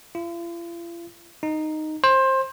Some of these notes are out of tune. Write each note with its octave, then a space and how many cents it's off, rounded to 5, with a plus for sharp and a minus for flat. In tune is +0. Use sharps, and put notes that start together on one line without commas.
F4 -45
D#4 -5
C5 +20